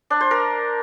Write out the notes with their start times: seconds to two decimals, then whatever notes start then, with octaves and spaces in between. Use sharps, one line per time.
0.10 D4
0.21 C5
0.31 A#4